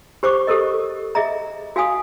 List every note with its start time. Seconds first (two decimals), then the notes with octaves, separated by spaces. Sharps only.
0.23 G4 C5 C#6 D6
0.47 G4 A4 A#4 D#5
1.15 G#4 D#5 E5 A#5
1.76 F#4 F5 G#5 D#6